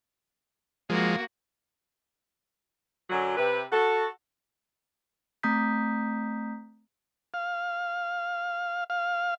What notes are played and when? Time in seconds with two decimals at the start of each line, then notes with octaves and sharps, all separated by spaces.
0.90 F3 G#3 A#3 F#4
3.09 F#2 D3 F#3
3.37 C3 B4
3.71 F#4 A4
5.43 A3 C4 A#5 D#6 G6 B6
7.34 F5
8.90 F5